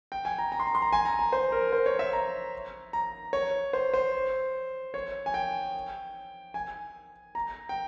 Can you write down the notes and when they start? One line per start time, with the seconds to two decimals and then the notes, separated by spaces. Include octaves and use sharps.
0.12 G5
0.25 G#5
0.38 A#5
0.52 A#5
0.60 C6
0.67 A#5
0.75 C6
0.82 A#5
0.93 G#5
1.05 A#5
1.19 A#5
1.33 C5
1.52 A#4
1.72 C5
1.86 C#5
1.99 E5
2.13 A#5
2.93 A#5
3.33 C#5
3.73 C5
3.94 C5
4.94 C#5
5.26 G#5
5.34 G5
6.54 G#5
7.35 A#5
7.69 G5